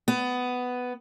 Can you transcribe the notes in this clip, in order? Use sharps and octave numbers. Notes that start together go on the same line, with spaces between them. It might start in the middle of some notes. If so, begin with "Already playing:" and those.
B3